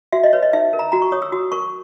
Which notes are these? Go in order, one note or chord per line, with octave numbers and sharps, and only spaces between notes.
F#4 E5
D#5
B4 C#5
D#5
D#4 E5
A#4
A#5
F#4 A#5
C#6
C#5 D#6
E6
F#4 D#6
A#4 C#6